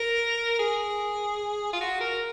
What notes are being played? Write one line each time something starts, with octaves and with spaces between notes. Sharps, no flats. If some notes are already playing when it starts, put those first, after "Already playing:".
Already playing: A#4
G#4
F4
F#4
A#4